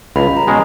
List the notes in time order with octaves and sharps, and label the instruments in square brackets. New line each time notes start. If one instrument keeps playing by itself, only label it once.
[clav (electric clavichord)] C#2 [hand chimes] B5
[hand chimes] A#5
[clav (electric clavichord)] B2 G#3 C#4